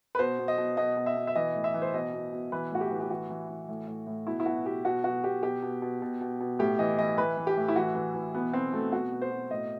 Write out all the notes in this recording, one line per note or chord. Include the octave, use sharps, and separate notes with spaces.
B4
B2 C5
B2
D#5
B2
B2 D#5
B2
E5
B2
E5
E3 D#5
A2
E5
E3
C5
B2 D#5
B2
B2
E3 B4
A2 F#4
G4
E3
G4
E3 F#4
E3
E3
A2
A2
A2
B2 E4
E4
B2 F#4
B2 G4
B2 F#4
B2 F#4
B2 G4
B2 G4
B2
B2
B2
B2
B2
A2 G4
E3 D#5
E3 D#5
E3 B4
E3
G4
A2
E4
E3 F#4
E3
E3
B2 B3
B2 C4
B2 A3
B2 F#4
B2
C5
B2
A2 D#5